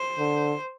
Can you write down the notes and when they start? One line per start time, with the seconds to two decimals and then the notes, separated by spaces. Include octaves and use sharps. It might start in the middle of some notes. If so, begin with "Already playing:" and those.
Already playing: C5
0.19 D3